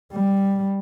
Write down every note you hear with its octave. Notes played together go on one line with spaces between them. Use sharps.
G3